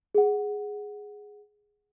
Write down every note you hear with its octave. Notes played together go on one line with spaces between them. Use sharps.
G#4 F#5